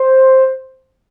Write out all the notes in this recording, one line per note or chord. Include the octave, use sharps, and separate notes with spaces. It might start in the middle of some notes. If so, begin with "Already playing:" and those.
Already playing: C5